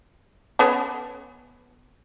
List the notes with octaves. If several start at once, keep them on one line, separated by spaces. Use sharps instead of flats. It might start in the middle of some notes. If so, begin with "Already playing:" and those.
B3 C#4 A4